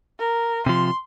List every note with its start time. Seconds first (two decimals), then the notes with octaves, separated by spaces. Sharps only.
0.19 A#4
0.66 C3 F3 C6